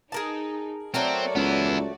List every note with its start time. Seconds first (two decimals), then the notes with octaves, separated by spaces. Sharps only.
0.12 D#4 G#4 A#4 A5
0.94 F#3 A3 C4 F#4 A#4 D5
1.35 C#2 B3 E4